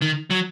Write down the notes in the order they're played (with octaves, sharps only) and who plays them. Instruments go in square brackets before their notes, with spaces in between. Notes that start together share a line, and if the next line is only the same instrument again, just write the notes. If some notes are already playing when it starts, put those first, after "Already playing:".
[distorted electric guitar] D#3
F#3